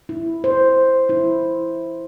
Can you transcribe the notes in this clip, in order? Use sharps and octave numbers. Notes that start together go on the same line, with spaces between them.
E4
C5
E4